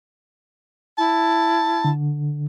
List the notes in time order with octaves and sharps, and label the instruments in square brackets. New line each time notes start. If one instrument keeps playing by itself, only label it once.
[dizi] E4 [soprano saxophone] A5
[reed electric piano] D3